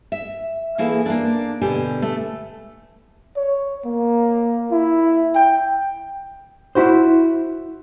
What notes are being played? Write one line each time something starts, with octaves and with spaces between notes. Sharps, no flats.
E5
E3 A#3 E4 G#4 A4
A#3 D4
B2 D3 G4 G#5
A3
C#5
A#3
E4
G5
E4 F#4 C5